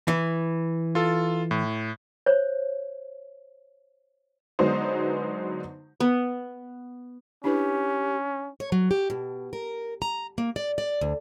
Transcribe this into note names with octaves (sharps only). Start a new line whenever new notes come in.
E3
F4 A4
A2
C5 C#5
D3 F#3 G#3 B3 D#4 C5
B3
C#4 D4 E4 G4 B4
C#5
F#3
G4
B2
A#4
A#5
A#3
D5
D5
D2